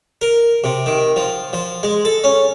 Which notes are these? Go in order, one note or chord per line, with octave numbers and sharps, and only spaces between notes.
A#4
C3
D#3
F3
F3
G#3
A4
C#4